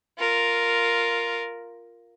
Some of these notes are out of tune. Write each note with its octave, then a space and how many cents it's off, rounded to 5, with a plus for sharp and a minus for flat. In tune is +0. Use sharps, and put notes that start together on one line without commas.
F4 +0 A#4 +0